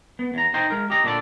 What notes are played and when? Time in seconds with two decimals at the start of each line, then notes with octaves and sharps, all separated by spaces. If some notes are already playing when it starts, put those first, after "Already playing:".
0.19 B3
0.34 E2 A#5
0.54 D#4 C5 G5 A#5
0.70 G#3 A#4
0.90 G4 D#5 A#5
1.04 A#2 D3 D4 A4 D5